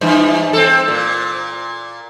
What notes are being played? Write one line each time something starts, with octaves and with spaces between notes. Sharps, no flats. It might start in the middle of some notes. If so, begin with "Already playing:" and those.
G2 E3
C4 A4
C4
A#2